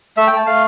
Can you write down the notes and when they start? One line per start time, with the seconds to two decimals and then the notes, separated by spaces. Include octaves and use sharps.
0.17 A3 E5
0.27 G5
0.32 A3 A5
0.46 A3 F5